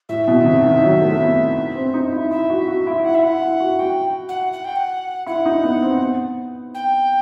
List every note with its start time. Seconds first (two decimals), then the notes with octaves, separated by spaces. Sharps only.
0.09 A2 E5
0.28 B2
0.41 D#3
0.46 C3
0.64 D#3
0.83 F#3
1.01 A3
1.20 B3
1.75 C4
1.94 D#4
2.13 E4
2.31 E4 E5
2.50 F#4
2.68 F#4
2.87 E4
3.04 E4 F#5
3.15 E5
3.23 E4 F#5
3.42 E4
3.60 F#4
3.79 F#4 G5
4.29 F#5
4.52 F#5
4.64 G5
4.76 F#5
5.26 E4 F#5
5.45 D#4
5.64 B3
5.82 C4
6.00 B3
6.74 G5